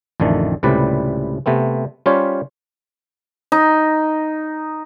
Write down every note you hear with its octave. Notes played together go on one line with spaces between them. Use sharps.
A1 F2 D3 D#3 A3
C#2 A2 C3 G3 B4 D5
C3 A3 B3 C4
G3 C#4 F4 G4 C5 C#5
D#4